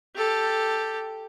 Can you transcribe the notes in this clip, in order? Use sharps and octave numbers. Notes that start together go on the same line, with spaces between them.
G4 A4